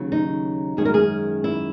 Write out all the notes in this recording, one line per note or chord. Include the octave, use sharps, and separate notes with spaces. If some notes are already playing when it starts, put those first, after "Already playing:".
Already playing: D#2 C#3 F#3
D#4
F#2 D#3 G#3 C#4 G#4
A#4
G#4
E4